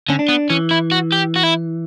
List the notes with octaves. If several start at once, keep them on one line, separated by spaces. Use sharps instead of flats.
D3 C#4
D4
B3
E3 C#4
E4
F#4
G4
F#4
E4